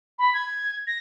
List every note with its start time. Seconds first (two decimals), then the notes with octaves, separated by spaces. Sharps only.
0.19 B5
0.34 G#6
0.87 A#6